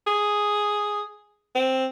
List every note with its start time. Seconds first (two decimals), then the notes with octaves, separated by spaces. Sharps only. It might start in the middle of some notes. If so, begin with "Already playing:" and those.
0.07 G#4
1.55 C4